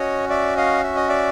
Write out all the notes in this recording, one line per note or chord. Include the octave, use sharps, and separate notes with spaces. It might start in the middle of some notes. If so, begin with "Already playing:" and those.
Already playing: C#4 F#4 C#5 D#5
D5 E5
D#5 F5
E5
D#5
D5 E5